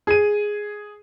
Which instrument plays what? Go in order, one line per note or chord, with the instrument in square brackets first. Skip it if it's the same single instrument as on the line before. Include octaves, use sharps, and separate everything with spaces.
[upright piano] G#4 D#7